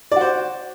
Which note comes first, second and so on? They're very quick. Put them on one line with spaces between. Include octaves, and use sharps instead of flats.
D5 F#4 C5